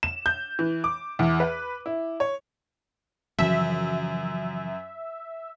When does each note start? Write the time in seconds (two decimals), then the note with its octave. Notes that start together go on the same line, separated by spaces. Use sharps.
0.03 E7
0.26 G6
0.59 E3
0.84 D6
1.19 E2
1.40 B4
1.86 E4
2.20 C#5
3.39 F#2 C#3 E3 F3 E5